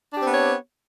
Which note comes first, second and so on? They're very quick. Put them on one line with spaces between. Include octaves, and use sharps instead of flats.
D4 G4 C4 B3 C#5